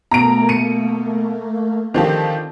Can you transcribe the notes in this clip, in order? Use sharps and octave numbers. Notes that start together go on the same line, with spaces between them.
B2 A3 A#3 A#5 D7
C#7 D#7
D3 D#3 F3 C4 G4 D#5